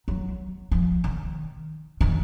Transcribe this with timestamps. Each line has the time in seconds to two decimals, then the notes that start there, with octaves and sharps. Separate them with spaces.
0.08 F#3
0.71 F3
1.04 D#3
2.01 D#3